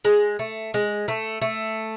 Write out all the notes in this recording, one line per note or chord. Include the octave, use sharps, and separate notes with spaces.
G#3
A3
G#3
A3
A3